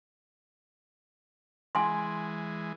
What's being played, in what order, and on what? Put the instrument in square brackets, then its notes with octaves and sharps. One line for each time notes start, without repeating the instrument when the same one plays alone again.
[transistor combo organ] E3 G#3 [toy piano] G#5 C6